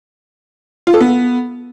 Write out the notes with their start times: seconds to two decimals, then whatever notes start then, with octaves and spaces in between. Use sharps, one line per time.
0.87 F4
0.94 A4
1.01 B3